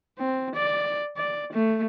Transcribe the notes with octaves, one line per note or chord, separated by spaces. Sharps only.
C4
D5
D5
A3